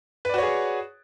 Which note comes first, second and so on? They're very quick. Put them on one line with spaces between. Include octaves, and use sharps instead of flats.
B4 D5 F#4 C#5 G#4